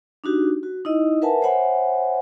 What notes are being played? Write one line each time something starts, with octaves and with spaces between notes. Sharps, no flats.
D4 D#4 F#4 G4
F#4
D#4 E4 D#5
A#4 B4 E5 F#5 G#5 A5
C5 C#5 E5 F#5 G#5 B5